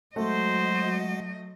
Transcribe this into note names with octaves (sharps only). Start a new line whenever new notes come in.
F#3 G#3 A3 F#4 C5 D#5 F#5